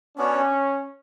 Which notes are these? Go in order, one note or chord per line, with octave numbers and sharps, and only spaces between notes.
B3 C#4 D4 F#4 C#5